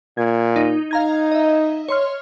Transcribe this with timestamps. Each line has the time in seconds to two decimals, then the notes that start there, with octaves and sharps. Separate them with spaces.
0.17 A#2 G#6
0.56 D#4
0.91 D#4 F5 A#5 G#6
1.32 D#5 E5
1.88 C#5 C6 F6